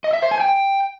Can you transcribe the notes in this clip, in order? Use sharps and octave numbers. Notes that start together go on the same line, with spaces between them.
D#5
E5
C5
G#5
G5